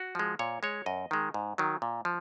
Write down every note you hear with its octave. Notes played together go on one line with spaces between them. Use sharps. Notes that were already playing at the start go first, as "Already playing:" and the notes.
Already playing: F#4
F3 G#3
A#2 C#5
G#3 C#5
F#2 D#5
D#3 G#3
G#2
D#3 F#3
A#2
F3